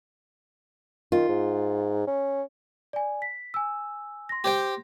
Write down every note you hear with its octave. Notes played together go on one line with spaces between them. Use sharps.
D#3 F4
G#2
C#4
D5 G#5
B6
G#5 E6
C6 A#6
G4 C5 G5